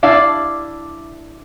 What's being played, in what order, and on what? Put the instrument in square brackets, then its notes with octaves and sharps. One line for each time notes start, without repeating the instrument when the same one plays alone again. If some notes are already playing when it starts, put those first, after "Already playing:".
[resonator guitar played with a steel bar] D4 E4 F5